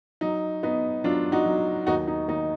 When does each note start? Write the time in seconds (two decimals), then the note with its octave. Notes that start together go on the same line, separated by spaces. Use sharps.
0.21 F#3 D#4
0.63 B3 D#4
1.04 F#3 D4 F4
1.32 D#4 F#4
1.46 F#3
1.87 D#2 D#4 F#4
2.07 D#4
2.28 D#2 D#4